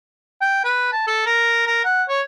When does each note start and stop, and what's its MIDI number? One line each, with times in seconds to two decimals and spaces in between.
0.41 0.61 79
0.65 0.89 71
0.93 1.02 81
1.07 1.22 69
1.26 1.66 70
1.67 1.82 70
1.85 2.03 78
2.09 2.21 73